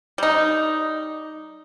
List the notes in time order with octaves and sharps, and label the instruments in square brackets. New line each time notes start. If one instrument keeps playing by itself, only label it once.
[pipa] G3 D#4